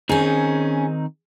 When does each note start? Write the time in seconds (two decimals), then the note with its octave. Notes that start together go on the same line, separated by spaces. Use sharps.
0.09 D#3 C4 C#4 D#4 G#4